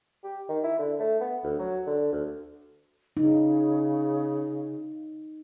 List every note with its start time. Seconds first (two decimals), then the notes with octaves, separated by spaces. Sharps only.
0.24 G4
0.48 D#3
0.64 E4
0.79 D3
1.00 A3
1.21 B3
1.44 D2
1.59 F#3
1.87 D3
2.13 D2
3.17 C#3 D#4